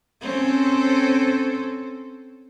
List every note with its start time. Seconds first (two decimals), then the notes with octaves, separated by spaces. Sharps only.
0.22 C4 C#4 A4